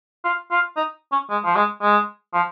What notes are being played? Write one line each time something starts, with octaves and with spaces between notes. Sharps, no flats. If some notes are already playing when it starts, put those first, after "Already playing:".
F4
F4
D#4
C#4
G#3
F3
G#3
G#3
F3